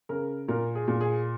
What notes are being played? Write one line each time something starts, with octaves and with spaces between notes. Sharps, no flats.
C#3 A#4
A#2 A#4
G#4
A#2
G#4